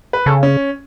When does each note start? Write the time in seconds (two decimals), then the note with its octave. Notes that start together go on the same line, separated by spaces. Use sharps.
0.13 B4
0.26 C#3 A4
0.43 C#4